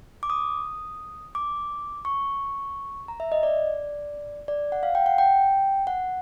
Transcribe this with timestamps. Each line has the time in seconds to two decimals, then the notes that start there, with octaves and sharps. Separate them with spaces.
0.23 D6
0.30 D#6
1.35 D6
2.05 C#6
3.08 A#5
3.20 E5
3.32 D#5
3.43 D5
4.48 D5
4.72 F#5
4.83 F5
4.95 G5
5.06 F#5
5.18 G5
5.87 F#5